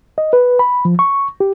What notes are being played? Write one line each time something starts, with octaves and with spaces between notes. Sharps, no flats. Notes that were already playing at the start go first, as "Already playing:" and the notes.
D#5
B4
B5
F3
C#6
G4